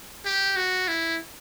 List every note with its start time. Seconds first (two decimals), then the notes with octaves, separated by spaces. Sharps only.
0.25 G4
0.56 F#4
0.88 E4